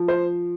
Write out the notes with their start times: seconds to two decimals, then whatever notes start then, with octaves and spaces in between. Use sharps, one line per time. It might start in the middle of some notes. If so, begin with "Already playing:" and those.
Already playing: F3
0.08 C5